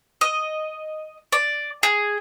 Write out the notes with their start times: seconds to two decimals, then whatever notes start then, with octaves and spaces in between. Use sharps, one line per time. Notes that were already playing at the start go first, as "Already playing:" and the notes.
0.21 D#5
1.32 D5
1.83 G#4